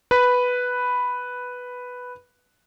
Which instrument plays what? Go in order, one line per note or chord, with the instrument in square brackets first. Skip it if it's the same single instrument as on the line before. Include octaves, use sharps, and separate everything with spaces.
[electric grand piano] B4 B5